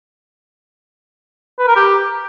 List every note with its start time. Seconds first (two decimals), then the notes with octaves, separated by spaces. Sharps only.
1.59 B4
1.67 A#4
1.76 G4